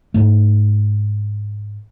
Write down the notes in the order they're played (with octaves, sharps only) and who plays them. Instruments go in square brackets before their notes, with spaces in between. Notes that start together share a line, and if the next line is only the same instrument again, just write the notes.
[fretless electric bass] G#2 A3